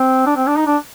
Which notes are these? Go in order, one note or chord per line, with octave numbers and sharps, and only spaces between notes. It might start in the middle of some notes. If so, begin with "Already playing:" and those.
Already playing: C4
D4
C4
D4
D#4
D4